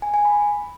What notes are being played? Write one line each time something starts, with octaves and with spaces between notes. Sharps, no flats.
G#5
G#5
B5